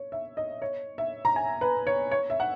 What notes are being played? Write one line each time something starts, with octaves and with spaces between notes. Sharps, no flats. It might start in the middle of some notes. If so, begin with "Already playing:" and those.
Already playing: C#5
E5
D#5
C#5
E5
A#5
G#5
B4
C#5
C#5
E5
F#5